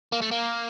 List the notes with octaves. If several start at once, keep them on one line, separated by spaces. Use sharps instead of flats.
A#3
A3
A#3